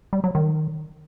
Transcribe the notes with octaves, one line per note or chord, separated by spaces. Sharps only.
G3
F#3
D#3